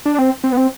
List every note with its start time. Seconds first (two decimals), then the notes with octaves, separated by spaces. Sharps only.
0.06 D4
0.19 C4
0.44 C4
0.53 B3
0.57 C4